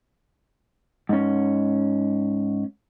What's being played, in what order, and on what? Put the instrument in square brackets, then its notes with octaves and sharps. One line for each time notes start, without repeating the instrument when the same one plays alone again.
[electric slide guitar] G#2 C#4